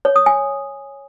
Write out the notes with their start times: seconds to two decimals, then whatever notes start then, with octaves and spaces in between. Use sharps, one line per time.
0.05 C#5
0.16 D#6
0.26 G#5